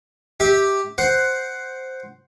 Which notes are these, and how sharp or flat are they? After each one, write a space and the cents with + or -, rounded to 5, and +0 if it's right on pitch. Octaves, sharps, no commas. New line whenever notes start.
G4 +0 E5 -25
C5 +0 F#5 +10